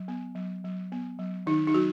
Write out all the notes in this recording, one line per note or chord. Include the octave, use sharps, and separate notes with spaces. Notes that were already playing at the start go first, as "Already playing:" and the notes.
Already playing: F#3
B3
F#3
F#3
B3
F#3
D#3 D#4
D#4
F#3 F#4